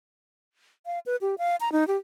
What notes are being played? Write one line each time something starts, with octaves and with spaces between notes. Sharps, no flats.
F5
B4
G4
F5
A#5
D#4
G4